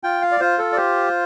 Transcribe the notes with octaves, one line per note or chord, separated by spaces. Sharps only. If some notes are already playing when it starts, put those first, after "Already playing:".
F4 G5
F5
D5
F4 C5
A4
D5
G4 C5